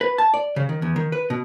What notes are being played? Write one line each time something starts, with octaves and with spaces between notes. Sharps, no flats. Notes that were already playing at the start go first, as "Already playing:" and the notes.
B4
A5
D5
C#3
D#3
E2
D#3
B4
B2